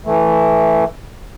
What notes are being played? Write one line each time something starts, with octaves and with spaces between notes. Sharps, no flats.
E3 A3